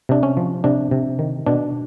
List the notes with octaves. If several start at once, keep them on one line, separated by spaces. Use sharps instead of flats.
C3 D4
C#4
F3
C3 D4
C3
D#3
B2 D4